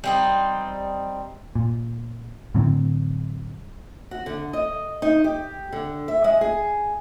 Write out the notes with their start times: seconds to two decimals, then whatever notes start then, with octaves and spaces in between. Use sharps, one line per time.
0.04 G3 C4 D#4
1.55 A#2
2.55 A2 D3 F#3 C4
4.11 F#4
4.26 D3
4.53 D#5
5.02 D#4
5.24 G4
5.72 D3
6.08 E5
6.24 G#3
6.41 G#4